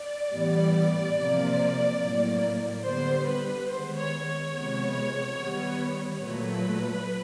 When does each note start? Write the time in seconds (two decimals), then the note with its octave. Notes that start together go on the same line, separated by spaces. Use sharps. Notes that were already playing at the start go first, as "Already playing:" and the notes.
Already playing: D5
0.33 A2 E3 G3 B3
1.18 C3 F3 A#3
2.01 A2 F#3 A#3
2.85 D3 G3 B3 C5
3.28 B4
3.69 D#3 G#3 B3 C5
3.97 C#5
4.26 C#5
4.54 C3 F3 G#3 B3
5.38 D#3 G3 B3
6.22 A#2 F#3 A3 B4